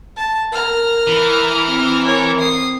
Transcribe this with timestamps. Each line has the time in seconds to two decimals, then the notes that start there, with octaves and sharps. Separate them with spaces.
0.16 A5
0.53 A#4 A#5 F6
1.07 E3
1.69 C4
2.06 A#4 C#5
2.40 D#6 C7